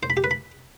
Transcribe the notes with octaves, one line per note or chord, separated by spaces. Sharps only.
C5
B5
G4
B4
B5